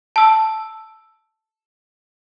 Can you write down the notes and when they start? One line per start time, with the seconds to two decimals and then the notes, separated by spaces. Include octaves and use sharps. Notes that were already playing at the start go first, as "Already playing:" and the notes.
0.16 A5 E6